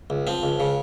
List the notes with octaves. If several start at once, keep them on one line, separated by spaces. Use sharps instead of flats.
C#2
F3 C4
C#2
C#3